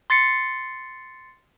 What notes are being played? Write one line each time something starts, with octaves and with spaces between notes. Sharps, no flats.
C6 A6 C7 C#7